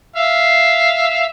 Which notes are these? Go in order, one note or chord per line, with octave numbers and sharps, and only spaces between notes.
E5 F5